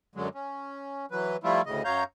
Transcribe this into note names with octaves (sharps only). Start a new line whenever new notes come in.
F#2 D3 F#3 G#3
C#4
E3 F#3 B4
F3 G3 A3 E4 F4
D2 A2 C#3 D#5
F#2 F#3 C#5 F5 A#5 G6